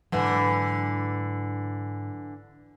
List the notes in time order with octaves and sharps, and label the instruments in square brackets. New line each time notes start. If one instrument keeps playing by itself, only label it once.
[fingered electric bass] G#2 F#3 [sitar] D3 E3